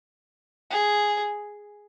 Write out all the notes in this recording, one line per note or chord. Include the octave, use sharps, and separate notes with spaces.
G#4